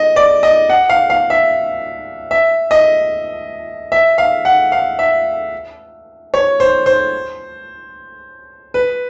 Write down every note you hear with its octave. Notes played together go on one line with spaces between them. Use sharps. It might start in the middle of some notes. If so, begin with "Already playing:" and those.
Already playing: D#5
D5
D#5
F#5
F5
F5
E5
E5
D#5
E5
F5
F#5
F5
E5
C#5
C5
C5
B4